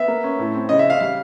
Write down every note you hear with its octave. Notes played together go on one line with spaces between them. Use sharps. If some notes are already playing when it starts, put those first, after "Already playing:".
Already playing: B3 E5
A#3
C#4
A2
C4
C#3 D#5
E5
C#3
F5
G3 F5